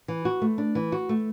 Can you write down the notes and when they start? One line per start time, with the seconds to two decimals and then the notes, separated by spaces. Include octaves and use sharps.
0.08 E3
0.25 F#4
0.42 A3
0.58 D4
0.75 E3
0.92 F#4
1.09 A3